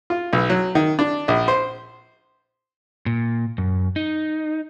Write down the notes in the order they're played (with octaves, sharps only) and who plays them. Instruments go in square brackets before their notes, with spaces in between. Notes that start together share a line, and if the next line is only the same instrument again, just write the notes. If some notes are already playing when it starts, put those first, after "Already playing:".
[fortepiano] F4
B1
F#3
D#3
D4
A#1
C5
[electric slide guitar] A#2
F#2
D#4